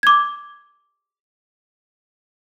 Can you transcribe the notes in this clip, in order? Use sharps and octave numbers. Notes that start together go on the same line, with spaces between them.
D6 G#6